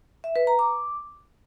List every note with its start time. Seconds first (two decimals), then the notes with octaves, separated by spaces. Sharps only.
0.24 E5
0.36 B4
0.47 A#5
0.59 D6